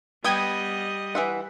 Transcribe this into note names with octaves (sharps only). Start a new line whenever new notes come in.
G3 B3 D#5 G5 D#6 G#6
E3 E5 F#5